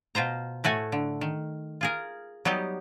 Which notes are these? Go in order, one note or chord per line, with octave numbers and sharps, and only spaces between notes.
B2 F4 C5 A#5
A2 A3 F#4 G#5
D3
D#3
F4 G#4 A#4
F#3 G3 B3 D#4 G4